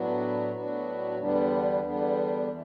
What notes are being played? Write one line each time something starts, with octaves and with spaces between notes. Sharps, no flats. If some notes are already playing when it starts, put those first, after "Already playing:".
Already playing: A2 F#3 B3 D4 F#4
A2 F#3 B3 D4 F#4
E2 D3 G3 B3 D4
E2 D3 G3 B3 D4
E3